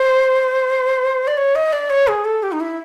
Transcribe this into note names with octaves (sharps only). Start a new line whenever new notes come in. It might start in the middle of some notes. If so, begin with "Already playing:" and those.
Already playing: C5
D5
C#5
D#5
D5
C#5
G#4
A4
G4
D#4
E4